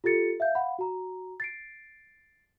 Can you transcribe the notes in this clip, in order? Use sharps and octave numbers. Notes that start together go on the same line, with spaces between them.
F4 G4 A4 A6 C#7
E5 F5 G6
F5 F#5 B5
F#4 A#5
A6 C7 D7